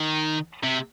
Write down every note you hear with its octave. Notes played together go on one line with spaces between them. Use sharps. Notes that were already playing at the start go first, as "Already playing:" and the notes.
Already playing: D#3
C3